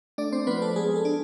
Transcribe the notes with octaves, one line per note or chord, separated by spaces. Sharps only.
A3 D4 D5
C4 C5
F3 B3 B4
A4
G#3 G#4
A4
D4